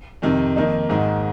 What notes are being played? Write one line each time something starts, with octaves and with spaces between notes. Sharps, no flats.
F2 C3 D#3
F2 D#3 A#3 D#4
G#1 G#2 D#3